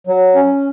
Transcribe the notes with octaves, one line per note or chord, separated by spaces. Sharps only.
F#3
C#4